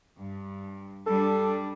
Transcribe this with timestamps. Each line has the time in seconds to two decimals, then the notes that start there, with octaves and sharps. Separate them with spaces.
0.18 G2
1.06 G3 D4 A4